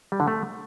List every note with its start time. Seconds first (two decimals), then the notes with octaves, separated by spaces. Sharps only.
0.12 G3
0.20 D3
0.28 A3